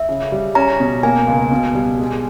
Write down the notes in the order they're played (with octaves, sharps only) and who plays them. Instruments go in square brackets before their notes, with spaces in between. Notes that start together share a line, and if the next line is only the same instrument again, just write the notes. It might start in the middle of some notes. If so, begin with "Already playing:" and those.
Already playing: [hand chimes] E5
[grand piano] C#3
G3
[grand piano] C#4 [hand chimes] A#5
[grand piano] B2
[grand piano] A#3 [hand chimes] G#5
[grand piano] C#2
B2
G3
G#3